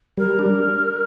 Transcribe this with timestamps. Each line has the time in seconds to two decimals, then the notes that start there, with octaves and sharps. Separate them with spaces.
0.18 G3 A#4
0.39 D4